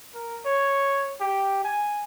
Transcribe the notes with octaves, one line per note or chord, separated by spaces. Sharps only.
A#4
C#5
G4
G#5